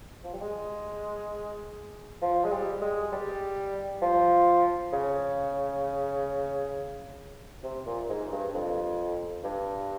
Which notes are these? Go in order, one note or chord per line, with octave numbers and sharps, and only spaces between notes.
F3
G3
G#3
F3
G#3
G3
G#3
G3
F3
C#3
C3
A#2
G#2
G2
F2
G2